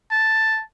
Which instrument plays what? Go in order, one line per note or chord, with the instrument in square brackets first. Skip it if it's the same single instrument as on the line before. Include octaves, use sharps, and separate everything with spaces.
[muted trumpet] A5